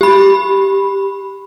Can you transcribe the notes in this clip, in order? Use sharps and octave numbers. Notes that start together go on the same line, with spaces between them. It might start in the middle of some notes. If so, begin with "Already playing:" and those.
G4 B5